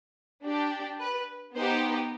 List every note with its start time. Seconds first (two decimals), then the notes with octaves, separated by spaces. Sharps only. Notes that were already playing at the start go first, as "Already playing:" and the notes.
0.44 D4 G4
1.00 B4
1.55 B3 D#4 G4 C5